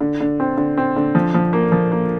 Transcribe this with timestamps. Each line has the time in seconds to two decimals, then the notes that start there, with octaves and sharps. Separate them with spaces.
0.01 D3
0.21 D3
0.40 C4
0.57 D3
0.77 C4
0.96 D3
1.15 F3
1.34 F3
1.53 A#3
1.72 F3
1.92 A#3